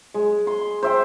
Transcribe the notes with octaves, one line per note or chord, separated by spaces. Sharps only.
G#3
C6
C5 E5 G5